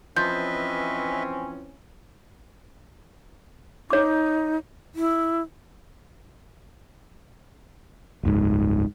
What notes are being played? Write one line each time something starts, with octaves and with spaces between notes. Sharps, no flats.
E3 F3 C4 C#4 B4 D#5 E5 G6
D#4 C#5 D6
E4
F#1 C#2 G#2